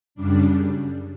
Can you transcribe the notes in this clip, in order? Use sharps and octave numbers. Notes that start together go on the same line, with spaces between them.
F#2 C#3 G3 D4